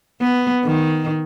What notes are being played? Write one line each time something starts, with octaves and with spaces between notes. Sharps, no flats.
B3
D#3